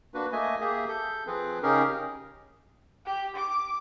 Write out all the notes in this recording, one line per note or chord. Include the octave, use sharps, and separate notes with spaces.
A#3 D4 F#4 B4
A3 A#3 D#5 E5 G#5
A#3 G4 G#4 E5
A4 G6
F3 C4 G#4 B4
C#3 C#4 D#4 G4 G#4 A#4
G4
D6